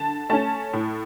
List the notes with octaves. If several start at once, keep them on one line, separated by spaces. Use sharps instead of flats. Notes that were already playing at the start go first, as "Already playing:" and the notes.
Already playing: D3 A5
A3 C#4 A5
A2